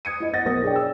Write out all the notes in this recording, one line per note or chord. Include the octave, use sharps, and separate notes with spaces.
D#6 G#6 C#7 D#7
E4 D#5
D#5 F#5 A6 A#6
B1 A#4 D#6 A#6
D4 G#4 C#5 D5 G5
E6